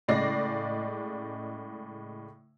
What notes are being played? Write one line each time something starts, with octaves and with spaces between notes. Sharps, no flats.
A2 C#3 G#3 D5 A#6 C7